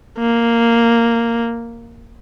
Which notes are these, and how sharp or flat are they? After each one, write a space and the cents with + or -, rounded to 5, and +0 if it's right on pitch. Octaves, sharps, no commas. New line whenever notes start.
A#3 -5